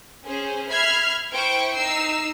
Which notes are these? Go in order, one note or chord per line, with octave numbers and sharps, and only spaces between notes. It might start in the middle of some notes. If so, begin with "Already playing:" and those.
C#4 G#4 C5
E5 B5 F6 G#6 C7
E4 C5 G5 C#6 D7
D#4 E6 C7